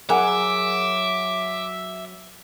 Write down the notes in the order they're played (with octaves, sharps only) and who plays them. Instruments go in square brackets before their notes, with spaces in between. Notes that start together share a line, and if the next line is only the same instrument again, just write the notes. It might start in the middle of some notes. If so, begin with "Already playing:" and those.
[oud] F#3 G#4 A#4 [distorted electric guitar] E5 [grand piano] F#5 G#5 [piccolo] D6